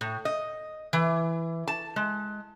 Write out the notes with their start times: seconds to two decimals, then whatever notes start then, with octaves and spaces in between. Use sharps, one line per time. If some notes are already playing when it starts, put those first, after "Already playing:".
0.01 A2
0.25 D#5
0.93 E3
1.68 A5
1.96 G#3